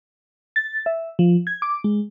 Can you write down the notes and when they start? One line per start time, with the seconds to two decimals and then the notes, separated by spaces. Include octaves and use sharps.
0.56 A6
0.86 E5
1.19 F3
1.47 G#6
1.62 D6
1.84 G#3